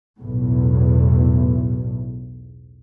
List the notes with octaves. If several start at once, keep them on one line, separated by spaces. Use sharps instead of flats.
B1 E2 A2